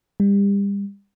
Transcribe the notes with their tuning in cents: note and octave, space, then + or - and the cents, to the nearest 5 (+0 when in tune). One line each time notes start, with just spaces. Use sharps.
G3 +35